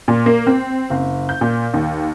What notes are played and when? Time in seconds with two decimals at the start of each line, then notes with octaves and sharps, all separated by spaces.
0.08 A#2
0.26 A#3
0.47 C4
0.90 F#1
1.29 G6
1.41 A#2
1.74 D#2